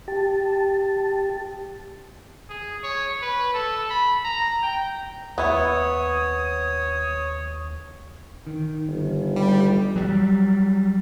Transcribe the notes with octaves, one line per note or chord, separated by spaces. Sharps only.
G4 A5
G#4
C#5
B4
A4
B5
A#5
G5
D#2 B3 E4 C#5 D#6
D#3
G1
G3
F#3 G3